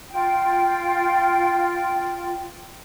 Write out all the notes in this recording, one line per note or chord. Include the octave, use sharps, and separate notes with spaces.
F4 G5